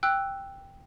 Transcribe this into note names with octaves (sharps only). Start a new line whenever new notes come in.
G5 E6 F#6